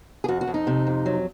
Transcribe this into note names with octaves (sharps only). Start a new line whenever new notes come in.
G#4
F2 F#4
F#4
F2
D#4
C3
F2
F#3